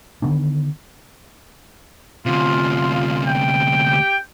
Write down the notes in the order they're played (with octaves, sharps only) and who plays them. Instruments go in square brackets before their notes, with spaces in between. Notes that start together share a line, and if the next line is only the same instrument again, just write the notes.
[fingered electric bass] D3 D#3 B3 D4
[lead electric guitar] D2 C3 [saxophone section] F4
[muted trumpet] G5
[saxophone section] G4